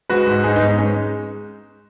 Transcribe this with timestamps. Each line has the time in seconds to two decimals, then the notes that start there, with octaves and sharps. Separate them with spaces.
0.09 G#3 F#4 B4
0.27 G#2
0.44 G#2 D#4 G#4
0.55 B3 D#4
0.62 G#3
0.67 B3 D#4
0.78 G#3 C#4